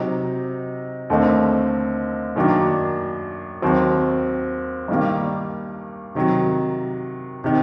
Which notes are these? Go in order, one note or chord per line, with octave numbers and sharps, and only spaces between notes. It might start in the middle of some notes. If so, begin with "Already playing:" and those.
Already playing: C3 F#3 C4 D#4
D#2 D3 A3 C4 D#4
F#2 D#3 F#3 A#3 D4
D#2 D#3 F#3 C4
G2 D#3 G3 A#3
C3 D#3 F#3
C3 D#3